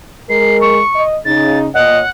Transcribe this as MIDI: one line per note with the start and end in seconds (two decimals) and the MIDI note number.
0.30 0.79 56
0.30 0.79 70
0.30 0.60 96
0.61 1.05 85
0.96 1.16 75
1.25 1.68 49
1.25 1.68 63
1.25 1.58 93
1.74 2.01 46
1.74 2.01 73
1.74 2.01 75
1.74 2.10 78